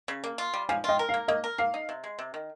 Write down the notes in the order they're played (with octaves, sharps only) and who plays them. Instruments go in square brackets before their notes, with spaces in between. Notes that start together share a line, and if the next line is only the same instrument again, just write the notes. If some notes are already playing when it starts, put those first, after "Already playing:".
[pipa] C#3
A#3
F4
G3
[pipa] F3 [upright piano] F5 G#5
[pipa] F4 [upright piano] D#5 G5
[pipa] A#4
[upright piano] F5
[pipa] A#3
[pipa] A#3 [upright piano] D#5
[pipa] A#4
[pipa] A#3 [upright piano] F5
[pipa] D#4
C3
G#3
C3
D#3